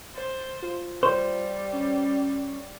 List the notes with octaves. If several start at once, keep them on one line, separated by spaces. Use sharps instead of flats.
C5 A6
F4
G3 C5
C#4